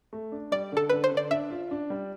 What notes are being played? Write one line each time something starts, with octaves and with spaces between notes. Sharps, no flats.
A3
D4
G3 D5
D3 A4
D3 B4
C5
D3
D5
D4 E5
F4
D4
G3